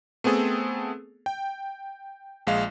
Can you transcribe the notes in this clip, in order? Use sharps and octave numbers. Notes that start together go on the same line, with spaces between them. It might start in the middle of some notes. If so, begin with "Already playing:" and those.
A3 B3 C4 G#4 A4
G5
A#1 G#3 F5